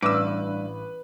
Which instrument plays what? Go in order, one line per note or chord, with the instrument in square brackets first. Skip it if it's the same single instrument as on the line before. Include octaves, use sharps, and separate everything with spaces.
[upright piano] A1 [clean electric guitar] G2 [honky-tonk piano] B4 [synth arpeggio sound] D6 E6